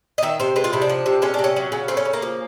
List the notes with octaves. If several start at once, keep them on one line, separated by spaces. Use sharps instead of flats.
D#5
D#3 E5
C3 C5
G#3 B4
F4
C3 E4
D4
F3
C3
G#3 C#4
C3 D4
C#4
F#3
C#3
A3 C4
C#4
C#3
A#3
F3